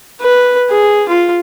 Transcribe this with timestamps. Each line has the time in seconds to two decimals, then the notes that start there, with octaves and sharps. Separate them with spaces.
0.22 B4
0.70 G#4
1.09 F4